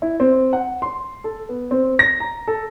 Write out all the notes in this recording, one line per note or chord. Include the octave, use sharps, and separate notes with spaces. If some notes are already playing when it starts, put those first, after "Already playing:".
E4
C4
F#5
C6
A4
B3
C4
A#6
A#5
A4